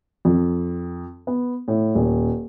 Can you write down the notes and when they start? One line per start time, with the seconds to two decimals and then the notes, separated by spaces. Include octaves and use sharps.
0.25 F2
1.27 B3
1.68 A2
1.95 D#1